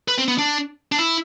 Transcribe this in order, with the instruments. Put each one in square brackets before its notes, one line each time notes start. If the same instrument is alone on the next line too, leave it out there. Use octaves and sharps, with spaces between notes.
[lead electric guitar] B4
C4
B3
D4
D4
E4